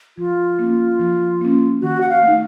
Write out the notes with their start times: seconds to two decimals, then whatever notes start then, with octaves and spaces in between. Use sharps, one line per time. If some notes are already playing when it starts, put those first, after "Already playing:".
0.18 F3 F4
0.59 A#3 C#4
1.00 F3
1.41 A#3 C#4
1.81 D#3 F#4
2.01 F#5
2.09 F5
2.23 A3 D#4